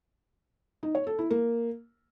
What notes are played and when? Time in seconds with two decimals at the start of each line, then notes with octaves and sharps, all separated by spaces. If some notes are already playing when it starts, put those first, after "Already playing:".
0.83 D#4
0.95 C#5
1.07 A4
1.19 E4
1.31 A#3